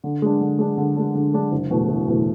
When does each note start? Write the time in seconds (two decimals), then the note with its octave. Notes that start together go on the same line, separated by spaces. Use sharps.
0.04 D3
0.22 G#3 D4
0.41 D3
0.59 G#3 D4
0.78 D3
0.97 G#3 D4
1.15 D3
1.34 G#3 D4
1.52 F#1
1.71 E2 B2 A3
1.88 F#1
2.08 E2 B2 A3